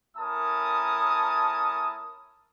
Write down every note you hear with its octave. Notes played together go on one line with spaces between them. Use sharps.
A3 C#4 E4 A#4 A5 D#6